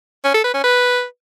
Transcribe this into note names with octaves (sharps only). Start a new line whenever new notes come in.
C#4
A4
B4
C#4
B4